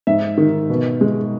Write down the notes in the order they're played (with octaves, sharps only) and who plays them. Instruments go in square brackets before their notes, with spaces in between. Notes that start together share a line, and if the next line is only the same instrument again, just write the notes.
[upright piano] G#2 E5
D#3
B2
G#3